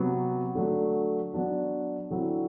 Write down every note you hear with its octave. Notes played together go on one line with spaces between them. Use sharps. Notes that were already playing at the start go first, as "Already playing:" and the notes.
Already playing: C3 F#3 B3
D3 F#3 A3
F#3 B3 D4 F#4
D3 F#3 C4 E4